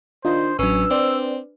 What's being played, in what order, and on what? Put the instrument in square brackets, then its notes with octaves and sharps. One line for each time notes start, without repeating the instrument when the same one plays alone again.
[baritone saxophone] D#3 [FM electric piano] D4 F4 D#5 [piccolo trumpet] C5
[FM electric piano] A1 F#3 [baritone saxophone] C#4 [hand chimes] D4 B4 [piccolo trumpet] E6
[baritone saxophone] C4 [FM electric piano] C5 D5